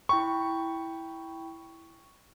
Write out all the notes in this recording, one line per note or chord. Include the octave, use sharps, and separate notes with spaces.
E4 G5 B5 C#6